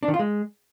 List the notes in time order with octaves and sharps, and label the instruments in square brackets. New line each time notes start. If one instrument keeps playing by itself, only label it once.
[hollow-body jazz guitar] D4
D#3
F4
G#3